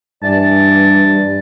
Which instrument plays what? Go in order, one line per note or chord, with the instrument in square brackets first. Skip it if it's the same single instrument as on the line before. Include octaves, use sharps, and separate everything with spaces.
[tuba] G2 [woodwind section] E3 D5 A5